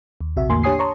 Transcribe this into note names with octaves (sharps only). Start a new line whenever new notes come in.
D#2
A#1 C3 F#4 E5
E2 A2 D3 A#3 G#5 C6
D4 G4 C#5 G#5 D#6 C7
C#5 A5 A#5 C6 C#6